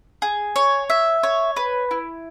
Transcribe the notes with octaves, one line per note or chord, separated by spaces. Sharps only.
G#4
C#5
E5
C#5
B4
E4